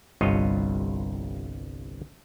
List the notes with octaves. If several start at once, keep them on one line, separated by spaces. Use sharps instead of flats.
G1 C2 G2 F4 C#5 D#5